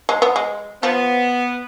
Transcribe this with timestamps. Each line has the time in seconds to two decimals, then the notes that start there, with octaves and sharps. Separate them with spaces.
0.09 G#3
0.22 B3
0.36 G#3
0.83 F3 B3